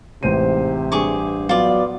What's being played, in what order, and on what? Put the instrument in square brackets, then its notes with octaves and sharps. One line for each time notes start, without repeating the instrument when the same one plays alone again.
[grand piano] A1 C5 D#7 [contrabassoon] G#2 [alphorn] C3
[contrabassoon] G2 [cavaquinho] G#4 C#6 D6
[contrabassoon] F#3 [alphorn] B3 [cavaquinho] F4 D5